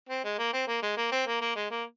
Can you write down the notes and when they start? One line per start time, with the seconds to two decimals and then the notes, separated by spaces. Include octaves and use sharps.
0.09 C4
0.24 G#3
0.39 A#3
0.53 C4
0.68 A#3
0.82 G#3
0.97 A#3
1.12 C4
1.27 A#3
1.41 A#3
1.56 G#3
1.71 A#3